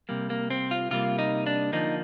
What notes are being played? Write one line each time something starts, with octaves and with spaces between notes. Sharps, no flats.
C3 G3 A#3
A#3
C4
F4
C3 G3 A#3 F4
D#4
D4
D3 F3 A#3 D#4